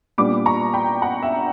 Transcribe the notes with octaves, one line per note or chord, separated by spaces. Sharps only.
A#2 G3 B3 D4 B5 D6
A#5 C#6
G5 B5
F#5 A#5
E5 G5